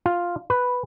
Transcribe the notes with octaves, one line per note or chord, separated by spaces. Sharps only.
F4
B4